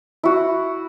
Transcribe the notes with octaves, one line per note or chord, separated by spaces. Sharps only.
E4 F#4